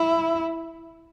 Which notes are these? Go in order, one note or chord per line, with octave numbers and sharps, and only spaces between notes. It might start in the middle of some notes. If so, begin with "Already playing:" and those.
Already playing: E4